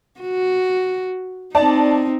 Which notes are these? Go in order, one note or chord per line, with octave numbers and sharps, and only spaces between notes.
F#4
C4 D#4 D5 A5